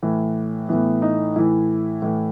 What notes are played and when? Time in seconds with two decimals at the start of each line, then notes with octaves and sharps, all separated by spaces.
0.03 A2 E3
0.69 A2 E3 B3
1.02 D#4
1.36 A2 E3 E4
2.02 A2 E3